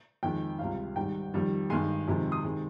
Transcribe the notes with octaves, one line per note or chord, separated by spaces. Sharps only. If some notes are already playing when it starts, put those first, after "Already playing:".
F2 D#3 G#3 G5
C#2 C3 G3 F5
G#2 D#3 G3 G5
F2 D#3 G3
G2 D#3 G#3 G#5 C6
F2 C3 D#3 G#3
C6 D#6
C3 D#3 G#3